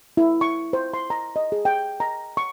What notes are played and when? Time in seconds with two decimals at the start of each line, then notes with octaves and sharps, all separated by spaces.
0.17 E4
0.41 C#6
0.73 C5
0.94 C6
1.10 A#5
1.36 D#5
1.52 G#4
1.65 G5
2.00 A#5
2.37 C#6